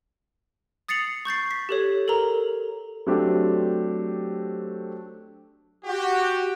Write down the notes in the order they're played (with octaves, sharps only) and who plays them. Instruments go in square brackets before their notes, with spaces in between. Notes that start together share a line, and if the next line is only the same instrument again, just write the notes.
[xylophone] D#6 A6 C7 C#7 F7 F#7
C#6 G6 A6 C7
B6
G4 A4 C#5
A4 A#4 A#5
[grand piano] F#3 A3 C4 D4 G4
[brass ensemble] F#4 G4